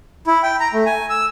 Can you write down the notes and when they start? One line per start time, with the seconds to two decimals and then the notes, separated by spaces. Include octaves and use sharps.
0.27 E4
0.43 G5
0.60 A#5
0.73 A3
0.86 G#5
1.10 E6